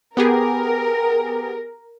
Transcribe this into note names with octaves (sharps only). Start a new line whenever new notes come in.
B3 G4 G#4 A#4